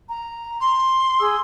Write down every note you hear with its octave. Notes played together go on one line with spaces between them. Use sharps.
A#5
C6
G#4 D#6 E6